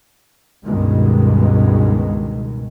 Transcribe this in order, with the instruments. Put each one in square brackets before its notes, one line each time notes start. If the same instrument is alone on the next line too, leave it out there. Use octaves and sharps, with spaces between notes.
[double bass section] C#2 G2 B2 D#3 G#3